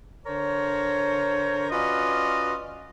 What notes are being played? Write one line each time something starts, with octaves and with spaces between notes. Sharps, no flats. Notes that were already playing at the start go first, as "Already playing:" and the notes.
D3 A#4 C5 C#5
C#4 F4 F#4 B4 D5 D#5